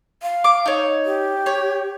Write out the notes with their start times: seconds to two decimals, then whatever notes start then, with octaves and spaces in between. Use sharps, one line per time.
0.23 F5
0.44 D6
0.66 D#4 C#5
1.05 G4
1.46 C#5